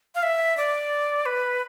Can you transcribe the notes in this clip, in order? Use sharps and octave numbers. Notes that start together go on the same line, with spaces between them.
F5
E5
D5
B4